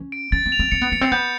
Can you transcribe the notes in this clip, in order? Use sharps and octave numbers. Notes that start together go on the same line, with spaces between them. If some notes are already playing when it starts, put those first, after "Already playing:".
Already playing: C#4
D7
C#4 A6
C4
F7
C4
C4 C#7
B3
B3 C#7
C4
B3 G6